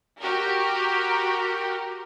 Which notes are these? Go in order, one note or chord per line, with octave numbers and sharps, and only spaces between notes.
F#4 G4 A#4